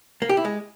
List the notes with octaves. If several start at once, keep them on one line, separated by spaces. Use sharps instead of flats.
A#3
G4
E4
G#3